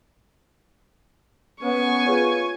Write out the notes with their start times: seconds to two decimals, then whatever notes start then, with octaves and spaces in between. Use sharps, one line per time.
1.62 B3 C#4 B4 G#5 C#6
2.06 F4 G#4 B4 C#5